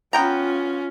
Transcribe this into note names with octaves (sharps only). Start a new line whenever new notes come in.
B3 C#4 F4 G5 A#5